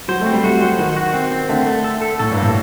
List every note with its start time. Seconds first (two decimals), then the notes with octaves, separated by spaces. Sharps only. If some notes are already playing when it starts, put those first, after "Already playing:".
0.08 F#3 C5
0.21 A3
0.26 C4
0.32 G3
0.44 A3 F#4
0.61 F#3 C5
0.79 D#3 F#4
0.96 F#4
1.14 C4
1.31 C4
1.49 D3 A3
1.67 A3
1.84 A4
2.02 A4
2.19 A2 A4
2.31 G2
2.37 A#3
2.43 A2